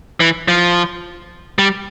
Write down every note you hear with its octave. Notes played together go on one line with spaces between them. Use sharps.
E3
F3
G3